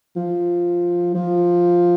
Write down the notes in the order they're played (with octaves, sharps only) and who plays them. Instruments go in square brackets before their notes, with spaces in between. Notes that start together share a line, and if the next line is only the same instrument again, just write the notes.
[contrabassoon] F3
F3